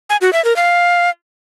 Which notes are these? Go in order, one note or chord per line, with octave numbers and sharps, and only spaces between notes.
G#5
F#4
E5
A#4
F5